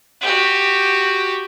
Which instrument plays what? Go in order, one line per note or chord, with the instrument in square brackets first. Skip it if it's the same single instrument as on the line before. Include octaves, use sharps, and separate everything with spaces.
[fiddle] F#4 G4